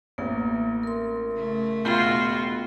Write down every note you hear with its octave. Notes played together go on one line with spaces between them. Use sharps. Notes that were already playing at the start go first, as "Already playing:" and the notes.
A1 A#3 B3
A#4 C6
C#3 A3
E1 F4 F#4 G5 B5 C6 G6